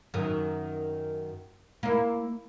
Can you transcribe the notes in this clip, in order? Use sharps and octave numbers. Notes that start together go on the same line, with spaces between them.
F#2 D#3
A#3 E4